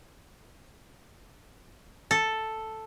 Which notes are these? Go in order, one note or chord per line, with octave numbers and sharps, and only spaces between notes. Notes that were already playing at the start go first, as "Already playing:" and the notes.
A4